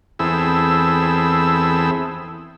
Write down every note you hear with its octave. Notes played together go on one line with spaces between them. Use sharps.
E2 C4 E4 G#4 A4 E6